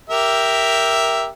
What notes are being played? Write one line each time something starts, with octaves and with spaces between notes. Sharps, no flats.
G4 A#4 E5